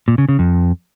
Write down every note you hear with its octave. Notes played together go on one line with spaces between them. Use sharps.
A#2
C#3
C#3
F2